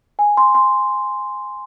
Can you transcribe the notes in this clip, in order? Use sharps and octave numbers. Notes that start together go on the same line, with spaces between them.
G#5
C6
C6